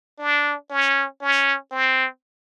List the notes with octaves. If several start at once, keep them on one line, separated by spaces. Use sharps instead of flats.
D4
C#4
C#4
C4